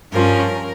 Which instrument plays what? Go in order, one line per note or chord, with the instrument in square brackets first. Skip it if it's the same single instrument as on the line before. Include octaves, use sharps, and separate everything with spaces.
[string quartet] G2 F3 C#4 A#4